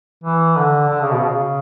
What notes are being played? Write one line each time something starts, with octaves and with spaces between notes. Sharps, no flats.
E3
D3
D3
C#3
B2
C#3